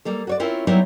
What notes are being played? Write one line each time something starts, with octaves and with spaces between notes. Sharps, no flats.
G3 A#3 A4
F#4 C#5 D5
C4 C#4 E4 F4 A#4
F#3 G3 B3 C4 D#4 E4